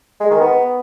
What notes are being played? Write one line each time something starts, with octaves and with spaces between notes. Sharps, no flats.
G#3
D#3
B3